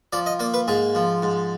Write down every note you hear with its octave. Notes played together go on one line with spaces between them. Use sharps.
F3 D5
D#5
A#3 D5
B4
G#2 G#4
F3
G#2